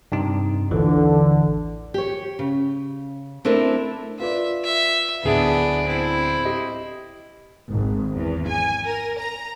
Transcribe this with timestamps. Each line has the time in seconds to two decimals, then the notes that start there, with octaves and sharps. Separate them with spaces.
0.12 G2 C3 D#4
0.71 A1 D#2 D3 E3
1.94 G4 C#5
2.39 C#3
3.45 A3 C4 D4 E4 A#4
4.19 F4 B4 D5 E5
4.64 E5
5.23 D1 B3 D4 G#4 E5
5.86 C4 E4
6.45 G4 D#5
7.70 G#1
8.15 E2
8.48 G#5
8.84 A#4
9.18 A#5